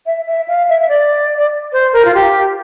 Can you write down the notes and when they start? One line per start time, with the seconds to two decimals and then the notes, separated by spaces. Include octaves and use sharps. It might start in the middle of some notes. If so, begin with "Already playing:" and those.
0.06 E5
0.27 E5
0.48 F5
0.69 E5
0.81 E5
0.89 D5
1.72 C5
1.93 A#4
2.05 F4
2.14 G4